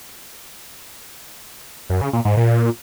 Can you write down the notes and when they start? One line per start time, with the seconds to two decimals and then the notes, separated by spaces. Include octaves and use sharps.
1.89 F#2
2.01 C#3
2.13 A#2
2.25 G#2
2.37 A#2